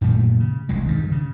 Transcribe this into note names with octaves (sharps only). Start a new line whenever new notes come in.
F#2 A#2 D#3 A3
C#3
E1 C2 G#3
G2 D#3
C#3